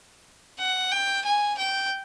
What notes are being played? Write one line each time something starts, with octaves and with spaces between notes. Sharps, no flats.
F#5
G5
G#5
G5